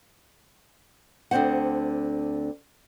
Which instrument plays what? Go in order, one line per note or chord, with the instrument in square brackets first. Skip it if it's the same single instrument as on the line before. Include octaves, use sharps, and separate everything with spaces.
[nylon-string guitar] D2 D3 C4 C5 F#5